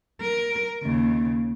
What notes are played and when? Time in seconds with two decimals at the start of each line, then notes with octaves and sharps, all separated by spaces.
0.21 A#4
0.83 D#2 C#3